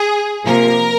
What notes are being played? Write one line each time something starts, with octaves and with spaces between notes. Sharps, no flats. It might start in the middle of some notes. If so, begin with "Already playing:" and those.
Already playing: G#4
C3 F3 A#3 A#4